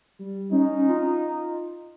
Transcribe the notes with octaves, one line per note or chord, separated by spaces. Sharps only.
G3
C#4 D#4
F4